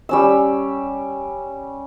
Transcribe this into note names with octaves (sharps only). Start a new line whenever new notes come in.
G3 C#4 E6